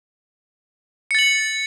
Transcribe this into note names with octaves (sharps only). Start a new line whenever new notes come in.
A6 C#7 F#7